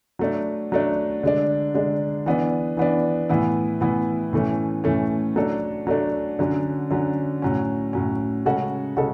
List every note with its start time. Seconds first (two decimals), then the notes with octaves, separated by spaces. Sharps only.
0.19 F#3 A3 D4
0.72 F#3 A3 D4
1.23 D3 G#3 D4
1.74 D3 G#3 D4
2.26 E3 B3 D4
2.77 E3 B3 D4
3.29 A2 E3 B3 E4
3.81 A2 E3 B3 E4
4.33 A2 E3 A3 C#4
4.84 A2 E3 A3 C#4
5.36 F#3 A3 D4 A4
5.87 F#3 A3 D4 A4
6.39 D3 F#3 C#4
6.91 D3 F#3 C#4
7.42 A2 F#3 C#4
7.93 A2 F#3 C#4
8.46 C#3 G#3 C#4 F#4 A4
8.97 C#3 G#3 C#4 F#4 A4